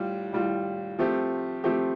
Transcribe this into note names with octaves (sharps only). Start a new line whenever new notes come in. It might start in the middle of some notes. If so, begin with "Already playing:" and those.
Already playing: A2 G3 F4
A2 G3 F4
F3 A3 C4 G4
F3 A3 C4 G4